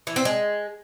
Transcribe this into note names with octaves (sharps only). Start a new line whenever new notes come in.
E3
C4
G#3